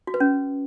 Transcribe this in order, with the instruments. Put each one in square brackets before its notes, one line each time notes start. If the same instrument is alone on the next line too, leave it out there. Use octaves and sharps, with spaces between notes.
[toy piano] F#4
B4
C#4